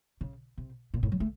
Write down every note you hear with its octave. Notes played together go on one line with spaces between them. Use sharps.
C#3
C3
A#2
A2
F#3
A3